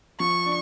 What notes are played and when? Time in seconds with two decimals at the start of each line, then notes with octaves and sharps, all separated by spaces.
0.20 F3 C#6
0.46 D4